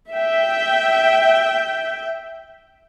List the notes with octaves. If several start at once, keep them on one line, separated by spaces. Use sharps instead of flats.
E5 G5